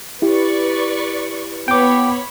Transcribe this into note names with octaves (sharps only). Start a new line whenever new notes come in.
E4 G4 B4 D5 C#6
B3 C#5 G5 B5 D6